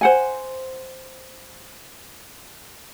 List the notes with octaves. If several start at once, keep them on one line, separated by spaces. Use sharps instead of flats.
C5 F#5 G#5